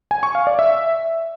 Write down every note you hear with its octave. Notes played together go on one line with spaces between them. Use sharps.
G#5
C#6
F5
D5
E5